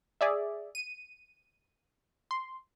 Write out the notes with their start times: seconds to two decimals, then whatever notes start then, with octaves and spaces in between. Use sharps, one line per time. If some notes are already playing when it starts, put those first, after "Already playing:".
0.21 G#4 D5 E5
0.75 D#7
2.31 C6